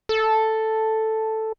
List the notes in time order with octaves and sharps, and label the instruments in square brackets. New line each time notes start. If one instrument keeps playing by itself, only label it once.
[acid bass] A4